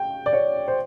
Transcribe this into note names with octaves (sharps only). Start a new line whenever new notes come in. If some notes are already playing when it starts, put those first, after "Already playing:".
Already playing: G5
D5
C#5
C5